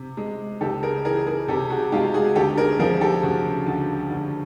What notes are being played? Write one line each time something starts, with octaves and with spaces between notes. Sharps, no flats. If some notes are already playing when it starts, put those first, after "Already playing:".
Already playing: C3
G#3
C#2 G4 A4
G#4 A#4
E3 G#4 A#4
G#4 A#4
C3 G4 A4
F#4 G#4
G#3 F4 G4
F#4 G#4
D2 G4 A4
G#4 A#4
F3 G#4 A#4
G4 A4
C#3 F#4 G#4
D2
D2